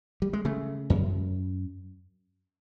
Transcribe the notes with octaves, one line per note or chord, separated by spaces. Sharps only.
G3
G#3
C#3 A3
F#2